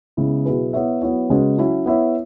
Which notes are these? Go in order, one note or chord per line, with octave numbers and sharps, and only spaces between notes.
C#3 G#3 B3 E4
B2 F#3 E4 G#4 B4
B3 E4 C#5 E5
F#3 B3 E4 C#5
C#3 G#3 C#4 F#4 B4
F#3 C#4 E4
B3 E4 C#5 E5